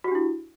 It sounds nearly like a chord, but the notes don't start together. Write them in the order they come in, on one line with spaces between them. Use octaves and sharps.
F#4 G4 D4 E4